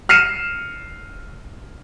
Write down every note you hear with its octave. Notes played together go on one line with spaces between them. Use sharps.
F6 C7 C#7 D#7 E7